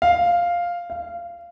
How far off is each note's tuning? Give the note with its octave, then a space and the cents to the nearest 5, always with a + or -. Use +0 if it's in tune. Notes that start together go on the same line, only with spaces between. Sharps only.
F5 +0
F5 -20